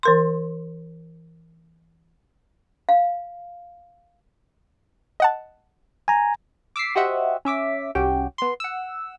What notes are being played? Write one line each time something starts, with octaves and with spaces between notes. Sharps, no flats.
E3 A#4 C6
F5
D#5 F#5 A5
G#5 A#5
D6 E6 B6 C7
F#4 G4 C5 D#5 E5 F#5
C#4 E5 D6 B6
C2 C#4 F#4 G4 G5
B3 C6
F#5 E6